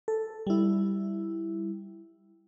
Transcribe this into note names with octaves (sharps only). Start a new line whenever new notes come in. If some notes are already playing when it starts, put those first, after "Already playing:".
A4
G3 E4